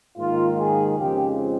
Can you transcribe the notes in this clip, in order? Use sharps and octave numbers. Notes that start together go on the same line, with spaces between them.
G#2 D#3 A#3 F4
G#4
F2 C#3 F3 G#3 C4 G4